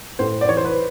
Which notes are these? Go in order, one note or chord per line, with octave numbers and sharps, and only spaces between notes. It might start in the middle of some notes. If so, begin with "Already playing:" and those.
A2 C5
D5
E3 C#5
C5
B4